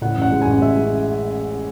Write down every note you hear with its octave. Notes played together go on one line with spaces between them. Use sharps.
A2 F#5
A1
F#5
G#3
A1 G#5
G#3 E5
G#3